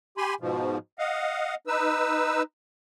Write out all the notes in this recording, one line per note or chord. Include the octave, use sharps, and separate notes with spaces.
G4 G#5 B5 C6
G#2 B2 F3
D#5 F5 F#5
D#4 B4 E6